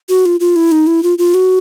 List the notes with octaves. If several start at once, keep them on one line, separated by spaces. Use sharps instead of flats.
F#4
F4
F4
E4
D#4
E4
F4
F4
F#4